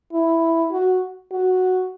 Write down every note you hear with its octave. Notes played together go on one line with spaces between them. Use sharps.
E4
F#4
F#4